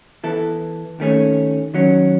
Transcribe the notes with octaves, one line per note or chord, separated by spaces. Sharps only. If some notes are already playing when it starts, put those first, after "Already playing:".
E3 B3 E4 A4
D#2 D#3 A3 C#4 G#4
D#3 F#3 C#4